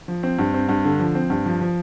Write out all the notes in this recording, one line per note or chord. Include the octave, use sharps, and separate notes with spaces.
F3
C4
G2
C4
G2
D3
F3
C4
G2
F3
F3